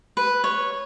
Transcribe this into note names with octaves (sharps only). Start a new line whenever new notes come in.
B4
C#5